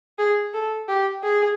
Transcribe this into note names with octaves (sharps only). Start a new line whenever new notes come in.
G#4
A4
G4
G#4